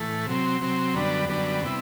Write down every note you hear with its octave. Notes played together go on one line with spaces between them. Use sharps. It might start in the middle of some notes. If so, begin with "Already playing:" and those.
Already playing: A2 E3 A3
C3 F#3 C4
C3 F#3 C4
F#2 D3 G3 B3 D4
F#2 D3 G3 B3 D4
C3 G3 B3 E4